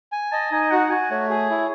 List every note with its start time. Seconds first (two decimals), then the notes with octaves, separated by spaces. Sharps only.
0.12 G#5
0.32 D#5 A5
0.52 D#4 G#5
0.71 F#4 F#5
0.91 F#4 G#5
1.10 A3 C#5
1.30 G#4
1.50 E4